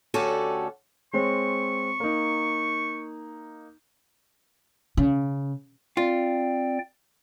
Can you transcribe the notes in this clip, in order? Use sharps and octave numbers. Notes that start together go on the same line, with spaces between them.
D2 C#4 F#4 G4 A4 D5
G#3 C4 C#5 C#6
A#3 D#4
C#3
C4 F4 D5 G5